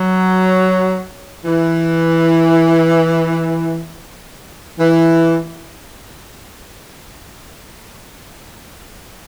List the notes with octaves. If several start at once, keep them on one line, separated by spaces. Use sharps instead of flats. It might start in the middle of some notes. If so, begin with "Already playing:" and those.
Already playing: F#3
E3
E3